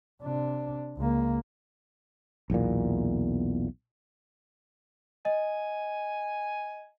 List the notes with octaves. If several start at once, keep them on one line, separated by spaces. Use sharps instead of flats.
C3 D4
C#2 A#3
B1 E2 A#2
D#5 G#5